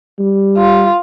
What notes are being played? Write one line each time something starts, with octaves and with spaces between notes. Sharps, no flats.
G3
F4